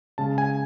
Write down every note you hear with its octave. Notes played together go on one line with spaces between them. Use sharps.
C#3 G#3 A5
G#5